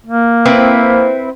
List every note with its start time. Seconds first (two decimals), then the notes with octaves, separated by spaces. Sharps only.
0.07 A#3
0.46 C4 E4 B4